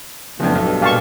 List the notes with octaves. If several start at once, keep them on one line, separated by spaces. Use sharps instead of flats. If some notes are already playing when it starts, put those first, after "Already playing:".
F#1 F2 A3 B3 D4
B1 G2 B2 A4
A#2 F5 A5 C#6